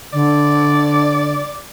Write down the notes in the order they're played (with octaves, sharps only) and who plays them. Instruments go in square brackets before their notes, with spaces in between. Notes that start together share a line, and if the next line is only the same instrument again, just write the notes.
[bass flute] D3 [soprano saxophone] D5